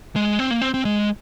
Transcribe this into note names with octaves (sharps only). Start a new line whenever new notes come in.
G#3
C4
A#3
C4
C4
G#3